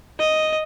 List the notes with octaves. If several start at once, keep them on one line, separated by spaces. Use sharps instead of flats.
D#5